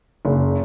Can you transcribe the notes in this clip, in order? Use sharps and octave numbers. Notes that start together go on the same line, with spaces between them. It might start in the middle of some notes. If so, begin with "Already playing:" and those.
F#1